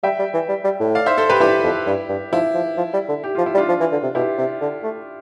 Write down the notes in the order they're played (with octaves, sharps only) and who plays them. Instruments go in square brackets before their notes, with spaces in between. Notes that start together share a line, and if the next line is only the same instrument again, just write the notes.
[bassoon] G3 [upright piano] E5 G5
[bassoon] G3
E3
G3
G3
A2
[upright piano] D5 F5
C5 E5
A4 C5
G4 B4
[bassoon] G2 [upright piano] E4 G4
[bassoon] F2
G2
G2
[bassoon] F3 [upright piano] E4
[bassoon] F3
F3
G3
D3
[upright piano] G4
[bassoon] F3 [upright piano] F4
[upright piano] E4
[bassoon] G3
[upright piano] D4 F4
[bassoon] F3
E3
D3
C3
[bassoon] B2 [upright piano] E4 G4
[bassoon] C3
D3
A3